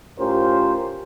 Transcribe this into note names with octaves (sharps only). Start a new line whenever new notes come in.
A2 C#4 F4 G4 A#4 C5